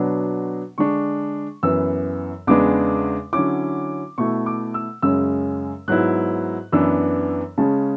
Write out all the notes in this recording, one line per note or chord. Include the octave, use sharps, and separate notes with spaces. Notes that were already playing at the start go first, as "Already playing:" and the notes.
Already playing: B2 F#3 B3 D4
D3 G#3 D4 C#6
F#2 E3 B3 E6
E2 C#3 G#3 B3 D4 D6
D3 F#3 C#4 E4 D6
B2 A3 E4 C#6
D6
E6
F#2 C#3 G#3 C#4 E6
G#2 F#3 B3 E4 F#6
F#2 E3 B3 D4 E6
C#3 G#3 C#4 A5